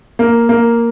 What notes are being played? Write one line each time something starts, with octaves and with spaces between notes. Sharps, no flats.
A#3
A#3